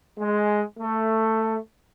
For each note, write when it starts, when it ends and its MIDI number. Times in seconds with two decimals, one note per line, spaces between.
0.17 0.62 56
0.78 1.57 57